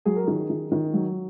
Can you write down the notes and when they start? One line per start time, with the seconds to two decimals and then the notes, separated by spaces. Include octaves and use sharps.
0.05 F#3 G#4
0.16 A#4
0.27 D#3 G#4
0.50 D#3
0.72 D#3
0.94 F#3